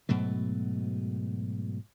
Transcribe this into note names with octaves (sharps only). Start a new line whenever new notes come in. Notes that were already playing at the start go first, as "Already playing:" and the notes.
G#2 B2 F#3 A3